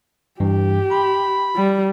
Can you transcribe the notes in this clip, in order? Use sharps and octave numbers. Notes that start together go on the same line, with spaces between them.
G2 E3 G4
B5 C6
G3